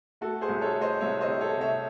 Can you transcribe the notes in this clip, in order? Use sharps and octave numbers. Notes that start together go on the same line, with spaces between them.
A3 F#4 A4
G#4 C5
C2
A4 C#5
A3
C5 D#5
C2 C#5 E5
C5 D#5
C3
A4 C#5
C3
C#5 E5